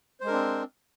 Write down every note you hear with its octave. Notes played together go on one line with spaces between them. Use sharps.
G#3 C4 D4 A#4 C5